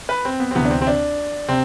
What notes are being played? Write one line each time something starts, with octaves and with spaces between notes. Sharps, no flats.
B4
C4
B3
C4
D2 C3 E3 B3
D4
C4
C4
D4
C3 C4